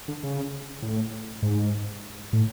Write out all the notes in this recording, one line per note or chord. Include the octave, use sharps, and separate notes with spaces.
D3
C#3
A2
G#2
A2